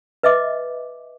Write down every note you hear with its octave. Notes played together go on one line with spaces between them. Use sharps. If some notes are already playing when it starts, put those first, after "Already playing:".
B4 D#5 E5 D6